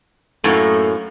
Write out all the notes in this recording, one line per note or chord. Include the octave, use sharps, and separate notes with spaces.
F#2 A2 A3 A#3